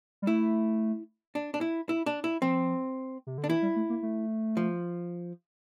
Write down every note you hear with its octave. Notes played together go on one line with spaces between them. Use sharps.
G3
A3 E4
D4
D4
E4
E4
D4
E4
F3 C4
C3
D3
D4
E3 E4
G3
A3
A#3
A3
F3